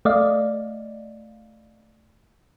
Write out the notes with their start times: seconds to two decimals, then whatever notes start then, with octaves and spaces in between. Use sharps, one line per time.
0.05 A3 D5 D#5 F5